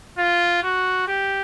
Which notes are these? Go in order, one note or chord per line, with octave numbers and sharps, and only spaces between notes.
F4
F#4
G4